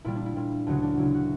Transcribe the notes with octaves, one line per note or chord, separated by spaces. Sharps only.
A#2 G3 E4
D4
E4
A#2 G3
D2 C#3 F#3 F#4
D4
D2 C#3 F#3 E4
F#4